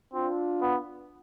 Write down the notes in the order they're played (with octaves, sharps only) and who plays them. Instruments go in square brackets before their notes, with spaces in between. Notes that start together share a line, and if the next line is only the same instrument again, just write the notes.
[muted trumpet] C4 [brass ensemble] D4 F4
[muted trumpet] B3